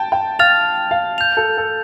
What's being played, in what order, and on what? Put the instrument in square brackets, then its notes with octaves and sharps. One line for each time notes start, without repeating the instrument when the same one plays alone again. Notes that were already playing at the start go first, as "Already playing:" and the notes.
Already playing: [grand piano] G5 A5
G5
[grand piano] F5 [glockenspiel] F6 A6 F7
[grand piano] F5
[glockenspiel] G6 F7
[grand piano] A4
A4